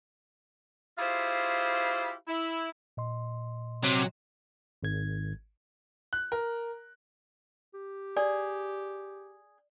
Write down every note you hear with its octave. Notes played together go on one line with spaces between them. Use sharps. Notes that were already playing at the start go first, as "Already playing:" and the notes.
E4 F4 G4 G#4 C5 F5
E4
A#2 D#5 C6
C3 F#3
G#1 G#6
F#6
A#4
G4
G#4 D5